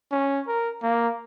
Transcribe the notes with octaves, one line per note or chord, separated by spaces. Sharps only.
C#4
A#4
A#3